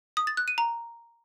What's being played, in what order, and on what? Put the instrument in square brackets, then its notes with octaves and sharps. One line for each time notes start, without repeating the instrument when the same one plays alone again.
[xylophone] D#6
A6
F#6
D#7
A#5